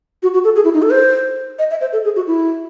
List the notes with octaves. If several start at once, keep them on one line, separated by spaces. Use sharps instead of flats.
F#4
F#4
A4
G#4
E4
D#4
A4
C5
D#5
E5
C5
A4
G#4
F#4
E4